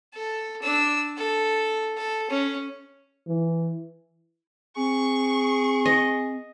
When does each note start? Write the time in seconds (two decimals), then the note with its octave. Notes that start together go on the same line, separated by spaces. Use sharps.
0.14 A4
0.62 D4 E6
1.18 A4
1.97 A4
2.30 C#4
3.27 E3
4.76 C4 G#4 C#6
5.86 D#5